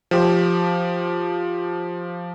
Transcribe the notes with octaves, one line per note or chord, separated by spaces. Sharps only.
F3 G4